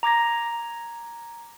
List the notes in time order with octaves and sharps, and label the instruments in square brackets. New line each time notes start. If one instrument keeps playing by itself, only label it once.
[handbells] A#5 D6 G#6 A#6